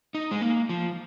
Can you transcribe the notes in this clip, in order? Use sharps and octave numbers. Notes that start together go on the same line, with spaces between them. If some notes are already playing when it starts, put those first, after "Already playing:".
D#4
G#3
A#3
F3